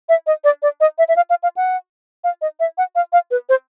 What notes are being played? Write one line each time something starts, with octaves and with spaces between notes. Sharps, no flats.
E5
D#5
D5
D5
D#5
E5
E5
F5
F5
F5
F#5
F5
D#5
E5
F#5
F5
F5
B4
C5